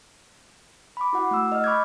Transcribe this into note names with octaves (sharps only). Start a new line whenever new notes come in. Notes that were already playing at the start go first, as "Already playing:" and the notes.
B5 D6
E4 F#4 F#5
A3 E6
D#5 F6
B5 C#6 D6 F6 G6 G#6